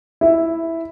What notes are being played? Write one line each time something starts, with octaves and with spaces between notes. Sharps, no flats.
E4 E5